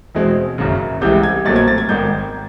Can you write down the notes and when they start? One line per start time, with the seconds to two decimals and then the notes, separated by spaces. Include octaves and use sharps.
0.15 E2 B2 G#3 C4
0.58 F#1 F#2 C#3
1.01 C2 C3 E3 G#3 G6
1.23 G#6
1.45 B1 A#2 F#3 A3 C4 A6
1.56 G#6
1.68 A6
1.78 G#6
1.89 G#1 G#2 D#3 G6